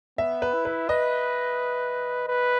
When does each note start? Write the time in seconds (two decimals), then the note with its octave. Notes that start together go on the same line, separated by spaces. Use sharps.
0.18 B3 E5
0.42 B4
0.54 E4
0.65 B4
0.89 B4 D#5
2.28 B4